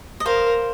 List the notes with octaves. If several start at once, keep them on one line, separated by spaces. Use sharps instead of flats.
D#5
A#4 C5 F5